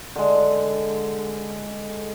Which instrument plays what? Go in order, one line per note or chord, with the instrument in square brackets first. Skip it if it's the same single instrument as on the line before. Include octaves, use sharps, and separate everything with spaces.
[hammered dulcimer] D3 G#3